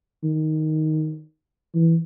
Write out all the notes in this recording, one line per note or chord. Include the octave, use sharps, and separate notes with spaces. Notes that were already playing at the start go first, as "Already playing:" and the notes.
D#3
E3